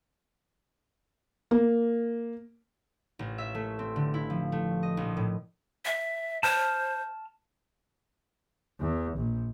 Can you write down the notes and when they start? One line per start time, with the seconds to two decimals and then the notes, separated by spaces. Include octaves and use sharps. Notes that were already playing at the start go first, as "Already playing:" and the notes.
1.51 A#3
3.19 A1
3.38 E5
3.55 A3
3.79 C4
3.96 D3
4.14 E4
4.30 F3
4.52 A3
4.83 D#5
4.97 A#1
5.17 A2
5.85 E5
6.43 C5 A5 F6
8.80 E2
9.17 A#1